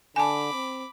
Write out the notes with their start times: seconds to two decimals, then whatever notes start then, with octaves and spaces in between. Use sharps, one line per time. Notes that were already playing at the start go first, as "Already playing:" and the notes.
0.16 D3 G#5 A5 B5 D6
0.52 C4